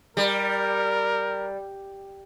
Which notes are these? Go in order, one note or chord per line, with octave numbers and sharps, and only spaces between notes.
G3 A#4